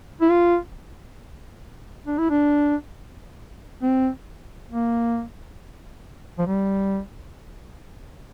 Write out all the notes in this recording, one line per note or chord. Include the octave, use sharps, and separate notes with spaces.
E4
F4
D4
E4
D4
C4
A#3
F3
G3